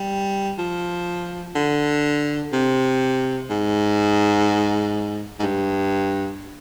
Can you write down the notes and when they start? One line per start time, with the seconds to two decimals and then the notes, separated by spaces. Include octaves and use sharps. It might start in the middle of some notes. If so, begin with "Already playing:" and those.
Already playing: G3
0.59 F3
1.56 D3
2.52 C3
3.50 G#2
5.40 G#2
5.43 G2